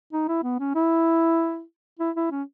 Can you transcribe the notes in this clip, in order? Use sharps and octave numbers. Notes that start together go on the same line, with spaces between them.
D#4
E4
B3
C#4
E4
E4
E4
C#4